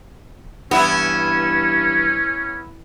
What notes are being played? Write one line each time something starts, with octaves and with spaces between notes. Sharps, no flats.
G2 E3 B3 C#4 E4